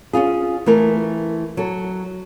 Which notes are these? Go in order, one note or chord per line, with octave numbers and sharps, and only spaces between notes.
C#4 D4 F4 G#4
E3 A3 A#4
F#3 A4